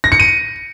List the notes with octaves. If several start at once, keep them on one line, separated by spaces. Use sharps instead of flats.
A#6
C#7
D#7